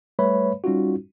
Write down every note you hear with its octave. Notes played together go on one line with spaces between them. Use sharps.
G3 A3 B4 C#5 E5 B5
G3 C#4 D#4 F4 F#4